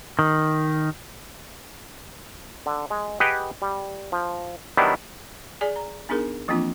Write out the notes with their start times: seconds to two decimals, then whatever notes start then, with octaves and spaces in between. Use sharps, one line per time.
0.19 D#3
2.66 D3
2.90 G#3
3.20 G4 G#4 B4 D#5 F#5 G5
3.62 G3
4.12 F3
4.77 D#3 F#3 G3 B3 D4 E4
5.61 G#4 D5 G#5
5.76 A#5
6.09 B3 D4 D#4 G#4 A#4
6.48 E3 F3 A#3 C4 D4 F4